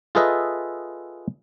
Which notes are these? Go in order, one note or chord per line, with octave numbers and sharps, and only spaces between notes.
F4 G#4 A4 B4 D#5 E5